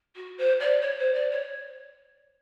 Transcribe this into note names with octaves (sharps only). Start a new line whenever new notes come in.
F#4
C5
D5
C#5
C5
D5
C#5